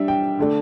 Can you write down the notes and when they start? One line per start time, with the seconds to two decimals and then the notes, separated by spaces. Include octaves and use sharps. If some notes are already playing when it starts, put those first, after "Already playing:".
Already playing: G3 D4 E5
0.08 G5
0.39 D3 A3 D4